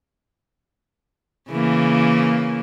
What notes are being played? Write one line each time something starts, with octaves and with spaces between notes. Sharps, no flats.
C#3 E3 A#3